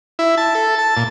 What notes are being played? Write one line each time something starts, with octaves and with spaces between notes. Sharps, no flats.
E4
A5
A4
A5
A#2